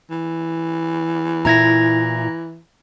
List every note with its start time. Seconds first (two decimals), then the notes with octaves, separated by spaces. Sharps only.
0.11 E3
1.45 A#2 E4 A#5 G#6 A#6